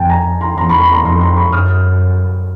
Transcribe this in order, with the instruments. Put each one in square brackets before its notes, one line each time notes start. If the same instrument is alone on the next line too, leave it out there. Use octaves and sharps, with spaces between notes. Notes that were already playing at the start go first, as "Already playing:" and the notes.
Already playing: [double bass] F2 [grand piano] G5 A5
[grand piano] G#5 A#5
A#5 C6
[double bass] E2 [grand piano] A#5 C6
[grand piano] B5 C#6
B5 C#6
A#5 C6
[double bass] F2 [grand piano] A#5 C6
[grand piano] A#5 C6
B5 C#6
[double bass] F#2 [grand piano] D#6 F6